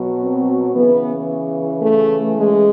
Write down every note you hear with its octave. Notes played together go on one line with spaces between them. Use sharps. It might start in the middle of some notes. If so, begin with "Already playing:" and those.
Already playing: B2 F#3
C4
C#3 E3 B3
A3
G#3